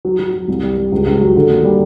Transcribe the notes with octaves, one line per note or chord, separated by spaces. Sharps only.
F#3
F#3
F#3
C2
G3
G3
C#2
C#2
F#3
D3
D#2
G3